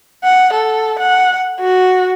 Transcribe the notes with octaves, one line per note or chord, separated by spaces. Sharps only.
F#5
A4
F#5
F#4